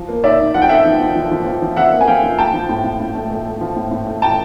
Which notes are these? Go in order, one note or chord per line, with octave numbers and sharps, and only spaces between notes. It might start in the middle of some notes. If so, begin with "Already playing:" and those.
Already playing: F3
A#3
D#4 D5 E5
D#4
F3 F#5
G5
D#4 E5 F#5
F3
F3
F3
F3
F3
F3
F3 E5 F#5
A#3
G#5
F3 F5 G5
F3
A3 G5 A5
F3
A2
A2
A2
A3
A3
A3
F3
A2
A2
A3
A2 G5 A5